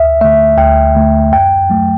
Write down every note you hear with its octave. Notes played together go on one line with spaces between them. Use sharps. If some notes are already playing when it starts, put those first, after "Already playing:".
Already playing: D2 E5
D3 A3 E5
D2 G5
D3 A3
F#2 G5
F#3 A3